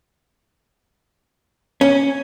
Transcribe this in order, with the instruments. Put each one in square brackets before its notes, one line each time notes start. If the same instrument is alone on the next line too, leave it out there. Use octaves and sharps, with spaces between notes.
[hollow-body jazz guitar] C#4